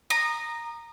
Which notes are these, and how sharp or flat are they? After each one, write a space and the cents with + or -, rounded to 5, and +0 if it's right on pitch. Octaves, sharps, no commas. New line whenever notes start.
A#5 +0 D#6 -25